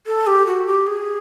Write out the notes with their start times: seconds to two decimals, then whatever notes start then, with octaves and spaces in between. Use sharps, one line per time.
0.07 A4
0.27 G4
0.47 F#4
0.67 G4
0.87 G#4